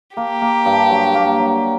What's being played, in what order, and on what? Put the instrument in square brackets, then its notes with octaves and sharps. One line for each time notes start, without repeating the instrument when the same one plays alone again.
[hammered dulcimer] A#3 [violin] G4
[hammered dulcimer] A#3
G2
F#3
A#3
F#3